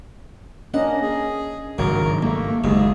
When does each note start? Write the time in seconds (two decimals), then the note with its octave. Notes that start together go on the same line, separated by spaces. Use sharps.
0.74 A#3 C#4 D4 D#5 F#5
1.02 G#4
1.78 G#1 G2 C#3 F#3 A#4
2.23 C2 A3 A#3
2.64 F#1 D#2 G#2 G#4